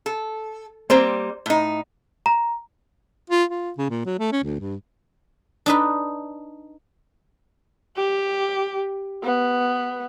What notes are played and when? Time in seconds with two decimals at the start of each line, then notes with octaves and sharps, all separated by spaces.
0.06 A4
0.90 G3 A#3 C4 C5
1.46 A2 D#4
2.26 A#5
3.30 F4
3.49 F4
3.78 C#3
3.90 A#2
4.06 F#3
4.19 A3
4.32 C#4
4.44 D2
4.60 G2
5.66 D4 D#4 B4
7.97 G4
9.24 B3